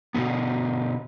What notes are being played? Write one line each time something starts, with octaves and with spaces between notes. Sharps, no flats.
B2 D3 F3 B3